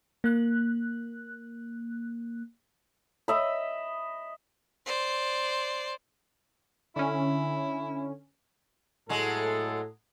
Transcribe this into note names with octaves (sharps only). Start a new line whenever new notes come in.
A#3 F#6
D#5 E5 B5
C5 D5
D3 C#4 E4
A2 F#3 G#3 A4